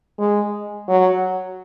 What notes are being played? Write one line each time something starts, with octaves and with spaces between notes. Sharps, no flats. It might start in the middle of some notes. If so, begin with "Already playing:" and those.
G#3
F#3